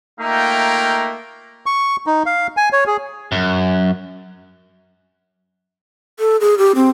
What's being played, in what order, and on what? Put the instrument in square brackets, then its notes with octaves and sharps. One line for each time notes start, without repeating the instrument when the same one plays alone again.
[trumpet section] A3 A#3 D#4 F4 E5 G5
[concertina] C#6
D#4
F5
G#5
C#5
G#4
[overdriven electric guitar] F#2
[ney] A4
G#4
G4
C4